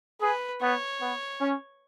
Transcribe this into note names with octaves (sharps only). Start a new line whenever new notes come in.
G#4 B4
B3 C#5
B3
C#4